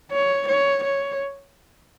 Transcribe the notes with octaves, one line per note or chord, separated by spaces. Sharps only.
C#5
C#5
C#5